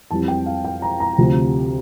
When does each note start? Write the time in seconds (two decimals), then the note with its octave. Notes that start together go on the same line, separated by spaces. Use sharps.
0.11 F2 E3 G3 C4 A5
0.28 G5
0.46 F5
0.65 G5
0.82 A#5
1.00 A#5
1.18 D2 C3 F3